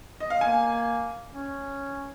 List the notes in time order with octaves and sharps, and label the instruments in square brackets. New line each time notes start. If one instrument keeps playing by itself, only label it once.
[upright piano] D#5
F5
[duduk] A#3 [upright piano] G#5
[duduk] C#4